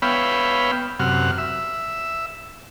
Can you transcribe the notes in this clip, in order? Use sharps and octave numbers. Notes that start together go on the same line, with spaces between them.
B3 C#5 E5 F5 G5 B5
F#2 C3 F#5 F6
E5